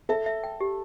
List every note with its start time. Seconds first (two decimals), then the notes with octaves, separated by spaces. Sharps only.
0.09 A4 E5 A5
0.26 E5
0.44 G5
0.61 G4